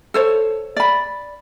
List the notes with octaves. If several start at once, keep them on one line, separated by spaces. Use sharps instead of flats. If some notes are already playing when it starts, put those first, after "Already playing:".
A4 C5 C#5
D5 B5